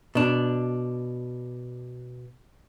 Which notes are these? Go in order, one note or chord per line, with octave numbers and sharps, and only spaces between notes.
B2 D4